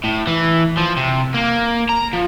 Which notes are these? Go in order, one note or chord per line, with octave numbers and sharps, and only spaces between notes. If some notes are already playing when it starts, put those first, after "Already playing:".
A2
E3
F3
C3
A#3
A#5
F3